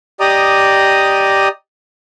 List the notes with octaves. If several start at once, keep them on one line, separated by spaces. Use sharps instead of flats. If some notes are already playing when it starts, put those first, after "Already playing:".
G4 D5 D#5 A#5 D#6